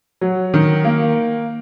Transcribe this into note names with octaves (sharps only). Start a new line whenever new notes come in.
F#3
D#3
A#3